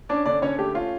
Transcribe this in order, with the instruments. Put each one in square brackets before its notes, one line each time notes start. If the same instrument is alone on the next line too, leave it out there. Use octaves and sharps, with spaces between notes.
[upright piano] C#4 D4 D5
D3 D4 D5
D3 C#4 C#5
A3 G4
C#4 F4